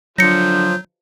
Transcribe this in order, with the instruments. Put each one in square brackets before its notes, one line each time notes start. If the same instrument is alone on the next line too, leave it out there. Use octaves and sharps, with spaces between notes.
[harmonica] D3 F3 [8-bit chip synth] F#3 [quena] G6 [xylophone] A#6 C#7